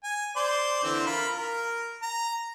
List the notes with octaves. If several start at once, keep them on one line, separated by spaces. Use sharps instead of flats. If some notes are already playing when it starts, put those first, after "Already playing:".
G#5
C5 D5 C6
D3 E3 C4
F4 A#4 B5
A#4
A#5